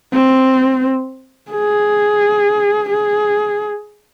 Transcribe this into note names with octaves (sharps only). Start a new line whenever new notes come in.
C4
G#4
G#4